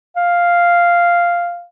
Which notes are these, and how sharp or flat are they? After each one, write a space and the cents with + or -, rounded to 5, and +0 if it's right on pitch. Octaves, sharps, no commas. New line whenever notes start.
F5 -5